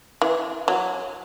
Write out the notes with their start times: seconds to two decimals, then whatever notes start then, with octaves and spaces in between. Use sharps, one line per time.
0.22 E3
0.68 F#3